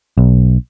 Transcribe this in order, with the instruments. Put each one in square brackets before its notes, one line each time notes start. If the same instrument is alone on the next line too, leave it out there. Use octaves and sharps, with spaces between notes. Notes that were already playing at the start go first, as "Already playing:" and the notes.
[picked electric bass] B1